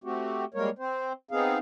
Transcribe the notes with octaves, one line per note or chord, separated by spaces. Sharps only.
A3 C4 F#4 G4
G3 G#3 A#3 A#4 C#5
C4 C5
B3 C4 D#4 G#4 F5